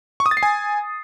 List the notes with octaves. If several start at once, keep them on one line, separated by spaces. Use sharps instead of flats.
C#6
D#6
A6
C7
G#5